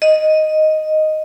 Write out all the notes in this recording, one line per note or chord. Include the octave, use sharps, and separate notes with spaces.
D#5